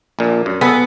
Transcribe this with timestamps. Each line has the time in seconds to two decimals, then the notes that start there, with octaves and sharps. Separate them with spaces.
0.19 A#1 A#2
0.46 F#2
0.61 B3 G#4 A4 B4